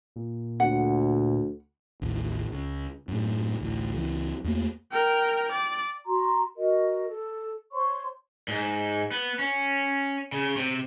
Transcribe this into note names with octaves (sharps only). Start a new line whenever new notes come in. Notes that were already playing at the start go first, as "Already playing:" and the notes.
A#2
D2 F#5
A1 D#2
C#2
F#2 A2
A1 D2
C#2 E3
E2 A3 A#3
A#4 G5
D5
F#4 A#5 C6
F#4 A#4 D#5
A4
C5 C#5 C6 C#6
G#2
B3
C#4
C#3
C3